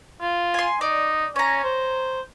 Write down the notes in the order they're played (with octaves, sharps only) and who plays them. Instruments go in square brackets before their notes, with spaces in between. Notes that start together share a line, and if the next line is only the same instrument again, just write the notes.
[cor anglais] F4
[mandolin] G#5 C6
[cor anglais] D#4 [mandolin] D5
[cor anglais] C#4 [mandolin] C#5 A#5
[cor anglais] C5